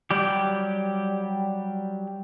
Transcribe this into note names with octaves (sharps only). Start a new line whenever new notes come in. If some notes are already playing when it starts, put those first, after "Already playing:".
F#3 G3 G4